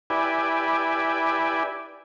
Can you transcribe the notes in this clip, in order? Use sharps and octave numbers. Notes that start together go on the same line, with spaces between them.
E4 G4 B4 D5 G#5